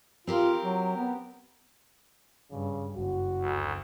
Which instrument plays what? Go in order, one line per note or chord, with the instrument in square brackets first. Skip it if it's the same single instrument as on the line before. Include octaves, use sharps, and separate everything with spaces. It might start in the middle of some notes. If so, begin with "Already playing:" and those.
[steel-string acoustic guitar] C4 G4 A#4 [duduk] F4
[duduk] F#3
B3
[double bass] G2 [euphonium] C#3
[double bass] F#1 [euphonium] F#4
[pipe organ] D2